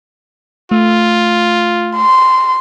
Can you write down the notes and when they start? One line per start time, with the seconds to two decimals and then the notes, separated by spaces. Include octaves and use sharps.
0.71 A3 F4
1.97 C6